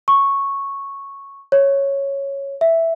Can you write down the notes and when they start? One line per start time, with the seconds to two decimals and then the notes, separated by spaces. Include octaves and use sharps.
0.08 C#6
1.52 C#5
2.61 E5